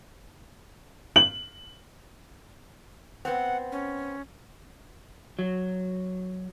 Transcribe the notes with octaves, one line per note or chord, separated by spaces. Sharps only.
F#7
B3 C4 F#5
C#4
F#3